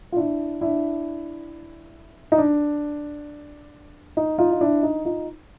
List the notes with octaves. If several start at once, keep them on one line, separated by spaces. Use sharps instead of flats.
F4
D4 E4
D4 E4
D#4
D4
D#4
D#4 F4
D#4
D4 E4
D#4
D#4 F4